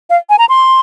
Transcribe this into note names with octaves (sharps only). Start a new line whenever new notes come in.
F5
G#5
A#5
C6